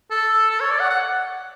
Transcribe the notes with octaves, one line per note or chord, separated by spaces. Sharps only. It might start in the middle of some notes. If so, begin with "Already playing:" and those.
A4
A4
C#5
D5
F#5
F#5